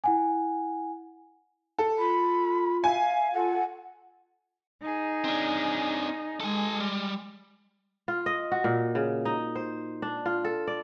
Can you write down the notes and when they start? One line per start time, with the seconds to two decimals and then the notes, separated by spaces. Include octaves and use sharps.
0.04 E4 F#5 G#5
1.78 A4
1.98 F4 B5
2.84 E5 F5 G#5
3.33 F4 A4 F#5
4.81 D#4 G#4
5.24 C4 D4
6.40 G#3 A4 G#5
6.80 G3
8.08 F4
8.26 D#5
8.52 F#4
8.64 A#2
8.95 C#3
9.25 D#4
9.55 C5
10.02 D4
10.26 F4
10.44 A4
10.67 D5